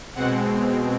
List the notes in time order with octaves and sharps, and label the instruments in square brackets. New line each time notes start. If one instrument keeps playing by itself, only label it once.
[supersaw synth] B2 G#3 C4 F#5